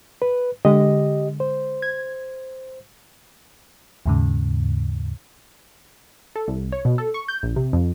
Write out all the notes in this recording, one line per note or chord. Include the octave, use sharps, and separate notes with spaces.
B4
D3 G#3 G4 D#5
C5
G#6
D#2 G#2 C#3
A4
C2
C#5
B2
A4
C#6
G6
A#1
C3
F2